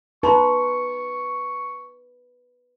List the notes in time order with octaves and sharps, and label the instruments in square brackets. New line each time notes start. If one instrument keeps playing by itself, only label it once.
[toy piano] D#4 A#5 C6 [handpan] B4 [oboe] C#6